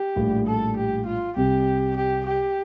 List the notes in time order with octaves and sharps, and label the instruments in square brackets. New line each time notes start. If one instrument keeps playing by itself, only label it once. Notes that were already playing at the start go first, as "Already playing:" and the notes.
Already playing: [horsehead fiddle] G4
[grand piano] A#1 A2 G3
[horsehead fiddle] A4
G4
F4
[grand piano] C2 C3 G3 [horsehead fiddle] G4
[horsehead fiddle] G4
G4